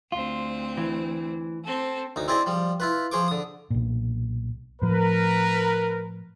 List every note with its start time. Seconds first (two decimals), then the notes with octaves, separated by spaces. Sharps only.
0.12 D2 C4 F4
0.77 E3
1.64 C4 A4
2.16 D2 D#4
2.28 C4 E4 G#4 C5 D5 D#5
2.46 F3 G3
2.80 E4 F4 B4
3.12 F3 G#4 C5 C#6 D6
3.28 D3 D#6
3.70 B1 A#2
4.82 A2 F3 A#4 B4